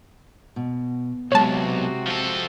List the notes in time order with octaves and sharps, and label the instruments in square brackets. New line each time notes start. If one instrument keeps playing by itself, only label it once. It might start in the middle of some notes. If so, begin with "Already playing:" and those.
[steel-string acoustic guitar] B2
[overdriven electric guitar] B1 [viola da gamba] C3 F#4 [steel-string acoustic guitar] G#3 G4 [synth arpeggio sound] C#5 A5
[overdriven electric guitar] F3 A4